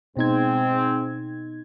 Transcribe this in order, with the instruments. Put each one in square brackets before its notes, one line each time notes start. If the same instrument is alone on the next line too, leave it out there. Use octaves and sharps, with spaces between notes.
[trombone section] G#2 C4 [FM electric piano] B2 D#4 G#6